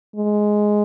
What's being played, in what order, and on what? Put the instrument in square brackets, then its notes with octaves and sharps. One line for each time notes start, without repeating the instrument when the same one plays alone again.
[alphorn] G#3